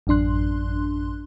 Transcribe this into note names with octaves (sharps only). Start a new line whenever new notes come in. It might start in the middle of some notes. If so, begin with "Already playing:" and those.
A1 F#2 D4 C6 F#6